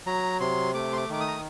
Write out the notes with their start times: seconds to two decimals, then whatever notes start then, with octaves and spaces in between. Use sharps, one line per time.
0.06 F#3 A#5
0.40 C3 C6
0.74 A3 D6
0.93 C6
0.97 D6
1.09 D#3 D6
1.20 D#6
1.28 A#5